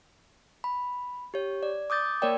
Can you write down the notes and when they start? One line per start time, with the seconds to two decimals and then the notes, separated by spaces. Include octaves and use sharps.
0.64 B5
1.34 G4 C#5
1.63 D5
1.90 D6 D#6 G6 A6
2.22 A#3 A#4 C#5 D5 G5